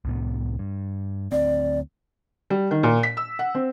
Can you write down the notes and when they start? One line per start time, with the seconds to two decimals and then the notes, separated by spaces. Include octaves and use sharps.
0.05 C2 A2 B3
0.59 G2
1.32 D2 C4 D5
2.50 G3
2.71 D#3
2.83 A#2
3.03 B6
3.17 E6
3.39 F#5
3.55 C4